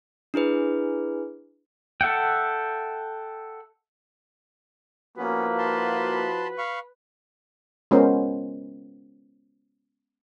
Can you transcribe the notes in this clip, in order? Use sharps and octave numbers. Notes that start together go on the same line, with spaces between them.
D4 E4 G#4 B4
A4 E5 F#5 G5
F3 A#3 B3 C#4 E4 F#4 B4
A5 B5 C6
F5 B5 C#6
G#3 B3 C#4 F4 A#4 C5